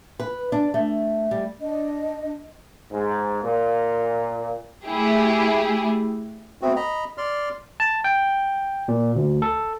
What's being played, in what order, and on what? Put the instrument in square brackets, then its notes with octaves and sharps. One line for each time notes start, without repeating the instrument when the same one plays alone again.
[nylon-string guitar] B4
D4
A3
G3
[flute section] D4 D#5
[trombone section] G#2
A#2
[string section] A3 E4 G4 G#4
[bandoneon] A3 B3 C4 F#4
D#5 A#5 B5
D5 C6 F6
[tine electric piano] A5
G5
A#2
D2
A4